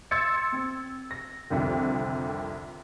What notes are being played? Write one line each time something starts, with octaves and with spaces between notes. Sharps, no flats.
C6 E6 G#6 A6 C#7
C4
A#6
C2 F2 D3 D#3